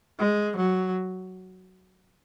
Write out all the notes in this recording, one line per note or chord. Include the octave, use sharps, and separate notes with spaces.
G#3
F#3